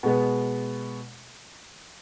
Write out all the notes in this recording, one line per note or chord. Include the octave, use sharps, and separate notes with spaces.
B2 G#3 B3